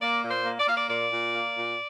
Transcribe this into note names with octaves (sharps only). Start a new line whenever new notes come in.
A#3 D5
A#2
C5
A#3
D5
A#3 F5
D5
A#2 D5
A#2
A#3
A#2